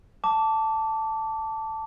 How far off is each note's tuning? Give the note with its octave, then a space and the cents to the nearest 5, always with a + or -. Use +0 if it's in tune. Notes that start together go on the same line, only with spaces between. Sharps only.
A5 +5 D6 -20